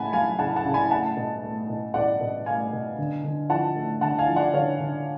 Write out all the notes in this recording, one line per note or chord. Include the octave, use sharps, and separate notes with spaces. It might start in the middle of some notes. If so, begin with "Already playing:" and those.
Already playing: C#3 A3 F#5 G#5 A5 B5
F#3 F5 G#5
C#3 F#5 A5
F#5 A5
C#3
G#5 B5
A3 F#5 A5
B2
A3
B2
B2 D5 F#5
B2
A3 F5 G#5
B2
D3
D3
F3 F#5 A5
A3
D3 F#5 A5
F5 G#5
F3
D5 F#5
D3 C#5 F5
D3